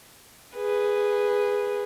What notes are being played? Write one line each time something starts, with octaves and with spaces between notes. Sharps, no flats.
G#4 B4